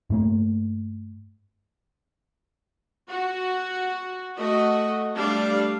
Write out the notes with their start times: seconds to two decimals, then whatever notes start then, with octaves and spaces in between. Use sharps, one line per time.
0.10 G2 A3 A#3
3.09 F#4
4.37 A3 F#4 D#5
5.14 G3 A3 D4 D5 F5